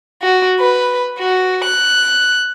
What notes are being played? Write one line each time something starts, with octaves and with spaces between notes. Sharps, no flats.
F#4
B4
F#4
F#6